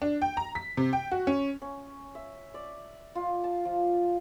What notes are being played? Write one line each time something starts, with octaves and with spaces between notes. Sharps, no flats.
D4
G5
A#5
B6
C3
G5
F#4
C#4
C#4
E5
D5
F4
A5
F3